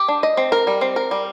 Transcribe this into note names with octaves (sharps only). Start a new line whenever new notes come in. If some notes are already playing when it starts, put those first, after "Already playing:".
Already playing: G4
D4
D#5
C4
A#4
G3
C4
A#4
G3